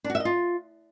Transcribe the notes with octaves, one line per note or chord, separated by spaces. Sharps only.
D4
F#4
E5
D#5
F4